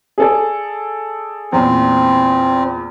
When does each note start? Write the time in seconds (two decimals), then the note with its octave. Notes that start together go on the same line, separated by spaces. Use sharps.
0.18 G#4 A4 D5
1.52 E2 A#2 C4